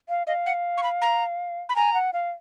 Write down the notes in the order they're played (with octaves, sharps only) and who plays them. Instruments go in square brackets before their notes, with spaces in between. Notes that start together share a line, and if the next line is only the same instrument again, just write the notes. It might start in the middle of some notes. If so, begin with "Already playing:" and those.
[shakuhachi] F5
[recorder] D#5 [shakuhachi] F5
[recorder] F#5
C#6
B5
A#5
B5
[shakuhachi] G#5 [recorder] A#5
[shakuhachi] F#5
F5